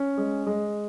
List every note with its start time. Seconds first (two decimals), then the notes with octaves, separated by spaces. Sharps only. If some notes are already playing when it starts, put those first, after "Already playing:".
Already playing: C#4
0.17 G#3
0.47 G#3